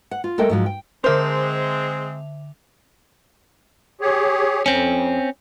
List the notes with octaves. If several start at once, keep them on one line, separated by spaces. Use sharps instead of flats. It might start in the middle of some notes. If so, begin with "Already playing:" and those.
F#5
F4
G#3 A3 A4 A#4 D#5 G5
G#2 F3 F#3
G5
D3 G#3 C4 A#4 C5 E5 F7
G4 G#4 C#5
F2 C4 C#4